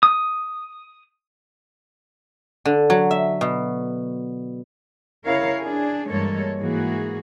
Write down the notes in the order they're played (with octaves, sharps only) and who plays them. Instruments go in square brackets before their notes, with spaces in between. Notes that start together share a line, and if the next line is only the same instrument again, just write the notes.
[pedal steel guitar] D#6
[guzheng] D3
F#3
E5
B2
[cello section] C#3 E4 A#4 C#5 F5
D4 G#4
G2 E3 G#3 A#3 A4 C#5
G#2 E3 A#3 F#4 G#4